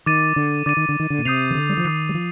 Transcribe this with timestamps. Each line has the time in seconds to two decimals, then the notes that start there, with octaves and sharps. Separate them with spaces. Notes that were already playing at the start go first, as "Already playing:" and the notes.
0.06 D#3 D6 A6 D#7
0.36 D3
0.66 D3 D6 A6 D#7
0.77 D#3
0.89 D3
1.00 D#3
1.10 D3
1.18 A#2
1.25 C3 D#6 G6 C7 F7
1.51 D#3
1.55 D3
1.69 G3
1.77 F3
1.85 D#3 D#6 G6 C7 F7
2.09 G3
2.14 F3